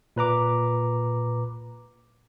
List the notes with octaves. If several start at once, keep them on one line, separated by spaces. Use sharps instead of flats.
A#2 B4 A#5 D6